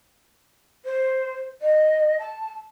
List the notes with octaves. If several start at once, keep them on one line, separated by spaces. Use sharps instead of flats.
C5
D#5
A5